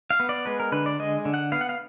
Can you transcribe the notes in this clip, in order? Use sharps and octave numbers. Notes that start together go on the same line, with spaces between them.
F5
B3
D5
G#3 B4
A#4
D3 B4
D5
G#3 D#5
D3
F#5
B3 F5
F#5
F5